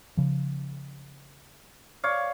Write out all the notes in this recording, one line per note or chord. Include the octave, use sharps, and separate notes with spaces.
C#3 F3
C#5 D5 F5